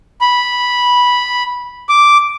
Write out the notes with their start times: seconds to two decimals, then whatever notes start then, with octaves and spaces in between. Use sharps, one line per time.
0.21 B5
1.89 D6